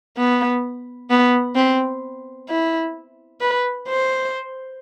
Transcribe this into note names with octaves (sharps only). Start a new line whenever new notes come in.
B3
B3
C4
E4
B4
C5